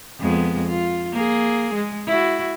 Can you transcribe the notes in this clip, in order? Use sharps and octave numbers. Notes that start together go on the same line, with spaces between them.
F2 G#3 B3
F4
A#3 G#4
G#3
E4 F#4